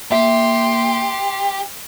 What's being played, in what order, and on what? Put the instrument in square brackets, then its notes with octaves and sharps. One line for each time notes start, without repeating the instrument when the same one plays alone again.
[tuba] A#3 [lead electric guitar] G4 [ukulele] E5 [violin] C6